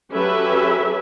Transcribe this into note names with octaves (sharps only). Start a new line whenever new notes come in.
F#3 C#4 G4 A4 B4 E5